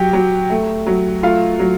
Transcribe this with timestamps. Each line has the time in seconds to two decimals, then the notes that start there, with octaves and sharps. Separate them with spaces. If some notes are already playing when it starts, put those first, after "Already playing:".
Already playing: F#3 G4 G5
0.13 F#3
0.50 A3
0.86 F#3
1.23 A3 F4 F5
1.59 F#3